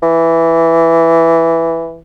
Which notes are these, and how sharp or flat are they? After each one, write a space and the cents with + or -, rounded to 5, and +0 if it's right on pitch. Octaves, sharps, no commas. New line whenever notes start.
E3 +5